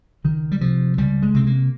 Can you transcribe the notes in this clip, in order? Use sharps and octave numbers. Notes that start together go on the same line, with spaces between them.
C#2 D#3
G3
C3 F3
C#2 G3
G#3
C3 C4
A#3